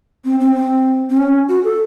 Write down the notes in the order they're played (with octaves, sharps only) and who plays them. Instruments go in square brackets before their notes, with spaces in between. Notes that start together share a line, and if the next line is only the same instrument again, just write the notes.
[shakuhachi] C4
C4
C4
C4
C#4
F#4
A4